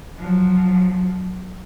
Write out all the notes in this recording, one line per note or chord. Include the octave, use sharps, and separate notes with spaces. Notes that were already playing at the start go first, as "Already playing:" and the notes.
F3 F#3